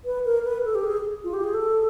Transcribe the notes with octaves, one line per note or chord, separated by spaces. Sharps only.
B4
A#4
B4
A4
G4
G#4
F4
G4
G#4
A4